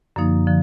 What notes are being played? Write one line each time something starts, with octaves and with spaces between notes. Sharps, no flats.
F#2 D3 F3 A#3 D#4
D3 F3